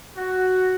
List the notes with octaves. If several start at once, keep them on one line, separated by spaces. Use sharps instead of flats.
F#4